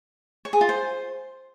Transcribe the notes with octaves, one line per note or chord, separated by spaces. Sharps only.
C#5
G#4
F4
C5